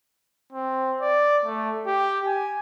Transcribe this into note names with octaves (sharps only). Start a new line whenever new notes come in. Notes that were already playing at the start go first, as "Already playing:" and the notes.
C4
D5
A3
G4
G#5